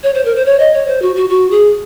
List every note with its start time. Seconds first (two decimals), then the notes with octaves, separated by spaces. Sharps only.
0.03 C#5
0.14 C5
0.25 A#4
0.35 C5
0.46 C#5
0.60 D#5
0.74 C#5
0.87 C5
1.02 F#4
1.16 F#4
1.29 F#4
1.51 G#4